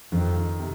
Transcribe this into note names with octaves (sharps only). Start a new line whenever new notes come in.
F2 D#3
D#3
C3